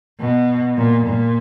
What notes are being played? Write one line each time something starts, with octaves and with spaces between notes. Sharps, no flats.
B2
A#2
A#2